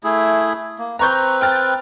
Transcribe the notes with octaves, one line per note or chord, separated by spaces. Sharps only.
A3 E4 G#4
A#3
C4 B4 A#5 C#6 G6
G5 F6 A6